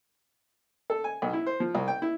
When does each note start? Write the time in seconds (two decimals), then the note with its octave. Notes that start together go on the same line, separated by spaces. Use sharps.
0.90 A4
1.04 G#5
1.22 B1
1.33 E4
1.46 C5
1.60 F3
1.75 C2
1.88 G5
2.02 E4